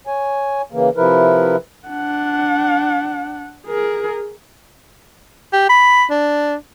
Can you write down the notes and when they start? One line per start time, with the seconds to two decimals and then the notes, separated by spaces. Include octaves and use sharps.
0.07 C#5 G#5
0.72 C#3 E3 A#3
0.96 C3 F3 E4 A#4 B4
1.88 D4 F#5
3.67 G#4 A#4
5.53 G4
5.69 B5
6.10 D4